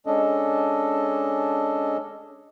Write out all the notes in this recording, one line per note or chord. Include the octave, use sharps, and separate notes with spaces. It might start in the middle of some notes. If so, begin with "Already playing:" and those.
G#3 C#4 D4 A4 D#5